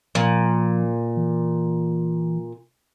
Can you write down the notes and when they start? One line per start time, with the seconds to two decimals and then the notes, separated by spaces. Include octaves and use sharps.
0.15 A#2 F3
1.17 E3